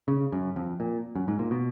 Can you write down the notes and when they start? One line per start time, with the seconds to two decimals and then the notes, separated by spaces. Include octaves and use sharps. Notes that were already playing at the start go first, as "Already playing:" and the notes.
0.08 C#3
0.32 F#2
0.56 F2
0.80 A#2
1.15 F#2
1.28 G#2
1.39 A#2
1.51 B2